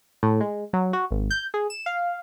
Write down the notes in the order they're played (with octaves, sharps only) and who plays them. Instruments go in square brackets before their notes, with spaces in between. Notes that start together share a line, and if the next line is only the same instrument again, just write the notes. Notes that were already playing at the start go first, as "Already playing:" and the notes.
[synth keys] A2
G#3
F#3
F#4
G#1
G6
G#4
E7
F5